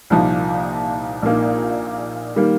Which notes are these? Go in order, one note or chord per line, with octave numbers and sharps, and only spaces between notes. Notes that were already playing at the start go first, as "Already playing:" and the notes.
C2 A#2 F3 D#4
A#1 A#2 A#3 D#4
D#3 G3 A#3